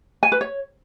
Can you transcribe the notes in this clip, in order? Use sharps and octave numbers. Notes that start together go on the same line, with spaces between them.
G#5
B4
C#5